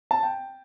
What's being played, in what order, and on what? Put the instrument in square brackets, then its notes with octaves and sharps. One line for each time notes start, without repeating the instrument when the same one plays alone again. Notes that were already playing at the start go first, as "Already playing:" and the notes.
[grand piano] A5
G5